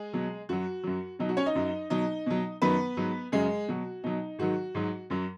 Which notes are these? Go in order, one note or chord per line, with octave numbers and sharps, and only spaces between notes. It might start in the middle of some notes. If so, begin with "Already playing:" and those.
Already playing: G#3 G#4
B2 F#3
F#2 F#3 F#4
F#2 F#3
B2 F#3 D#4
F#4
C#4 C#5
D#4 D#5
F#2 F#3
B2 F#3 D#4 D#5
B2 F#3
F#2 D#3 F#3 B3 B4
G#2 F#3
F#2 C#3 F#3 G#3 G#4
B2 F#3 F#4
B2 F#3 D#4
G#2 D#3 F#3 F#4
G#2 F#3
F#2 F#3